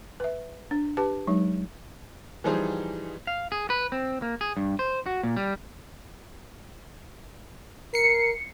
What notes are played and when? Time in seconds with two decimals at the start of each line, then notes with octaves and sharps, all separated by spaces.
0.20 B4 E5
0.71 D4
0.97 G4 B4 A5
1.28 F#3 G#3 D#4
2.44 E3 F3 G3 D#4 G#4 C5
3.27 F5
3.52 G#4
3.70 B4
3.92 C4
4.22 A#3
4.41 G#4
4.57 G2
4.79 C5
5.06 F#4
5.23 A#2
5.36 G3
7.94 A#4 C7 C#7